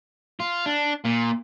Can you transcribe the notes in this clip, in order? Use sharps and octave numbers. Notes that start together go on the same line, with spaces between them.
F4
D4
A#2